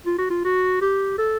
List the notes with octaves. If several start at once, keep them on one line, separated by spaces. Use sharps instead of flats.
F4
F#4
F4
F#4
G4
A4